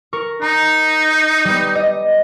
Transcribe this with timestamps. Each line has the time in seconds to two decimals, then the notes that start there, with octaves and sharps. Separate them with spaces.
0.13 A#4 C#6
0.42 D#4 A#5
1.45 G3 B3
1.75 D#5